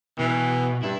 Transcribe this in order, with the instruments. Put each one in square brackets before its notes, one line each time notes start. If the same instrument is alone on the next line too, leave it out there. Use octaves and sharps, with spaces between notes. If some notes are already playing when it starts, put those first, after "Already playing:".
[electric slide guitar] B2 [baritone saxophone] E3
[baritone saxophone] G2 [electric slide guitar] E4